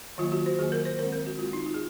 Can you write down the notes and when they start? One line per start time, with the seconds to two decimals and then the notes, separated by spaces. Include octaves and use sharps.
0.18 D#3 F#3 A#3 F4
0.32 F#4
0.46 C5
0.58 D#3 F#3 A#3 G#4
0.72 A#4
0.85 C5
0.99 D#3 G#3 C4 A#4
1.12 A#4
1.26 F#4
1.39 D#3 G#3 C4 F4
1.53 D#4
1.66 F4
1.74 G#4